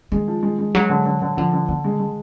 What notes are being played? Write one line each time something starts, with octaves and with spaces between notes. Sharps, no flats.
D#3 G#3
F3
G#3
G#3
F#3 G#3
D3
D3
D3
D3 F3
D3
D3 D#3
G#3
G#3